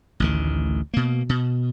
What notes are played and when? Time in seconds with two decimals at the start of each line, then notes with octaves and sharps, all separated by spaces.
0.20 A1 D2 D#3
0.94 B2 A#3
1.29 B2